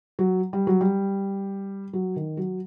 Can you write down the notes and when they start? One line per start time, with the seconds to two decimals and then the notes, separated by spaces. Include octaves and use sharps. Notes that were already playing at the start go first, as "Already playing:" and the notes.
0.19 F#3
0.53 G3
0.67 F#3
0.81 G3
1.93 F#3
2.16 D#3
2.37 F#3